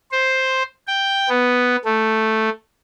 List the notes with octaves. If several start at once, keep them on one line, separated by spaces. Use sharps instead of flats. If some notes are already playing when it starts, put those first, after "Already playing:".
C5
G5
B3
A3